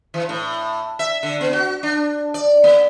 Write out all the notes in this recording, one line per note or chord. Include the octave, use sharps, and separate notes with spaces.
E3
A2
E5
D3
B3
F#4
D4
D5
A#3